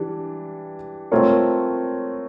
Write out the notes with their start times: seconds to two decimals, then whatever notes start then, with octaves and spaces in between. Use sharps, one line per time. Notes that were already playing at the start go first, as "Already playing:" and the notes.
Already playing: E3 G3 D4
1.12 A3 C4 F4 A#4 C#5